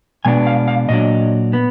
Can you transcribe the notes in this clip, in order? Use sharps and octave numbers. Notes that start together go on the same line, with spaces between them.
B2 G#3 B3 D4 G#5
F5
F5
A#2 F#3 D4 D#5
B3